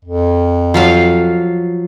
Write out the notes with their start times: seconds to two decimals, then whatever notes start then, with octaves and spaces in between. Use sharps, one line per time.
0.05 F2
0.74 F3 F#3 F5